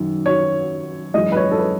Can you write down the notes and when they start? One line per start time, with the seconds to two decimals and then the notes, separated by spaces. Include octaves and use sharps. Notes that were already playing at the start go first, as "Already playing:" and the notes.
Already playing: F#2 D#3
0.26 C#5
1.14 F#2 E3 G#3 D#5
1.32 B4
1.37 C#5
1.51 A4
1.58 B4